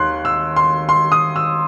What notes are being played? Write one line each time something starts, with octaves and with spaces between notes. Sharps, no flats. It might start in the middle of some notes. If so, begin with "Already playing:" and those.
Already playing: D#2 D#3 C6 F#6
E6
C6
C6
D#6
E6